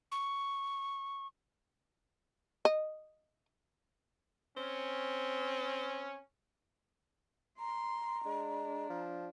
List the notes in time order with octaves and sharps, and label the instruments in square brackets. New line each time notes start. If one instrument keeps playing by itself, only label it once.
[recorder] C#6
[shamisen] D#5
[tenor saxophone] C4 [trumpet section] C#4
[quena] A#5 [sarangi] C6
[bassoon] G#3 [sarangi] D4
[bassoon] F3